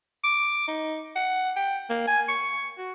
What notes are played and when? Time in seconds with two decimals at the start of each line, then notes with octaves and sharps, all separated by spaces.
0.24 D6
0.68 D#4
1.16 F#5
1.56 G5
1.90 A#3
2.08 G#5
2.28 C#6
2.78 F#4